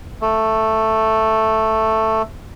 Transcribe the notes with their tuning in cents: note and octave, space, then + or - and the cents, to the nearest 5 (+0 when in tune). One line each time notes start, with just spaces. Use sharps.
A3 +5